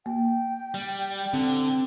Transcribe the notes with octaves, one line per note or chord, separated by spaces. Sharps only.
A#3 G5
G3
D3 C4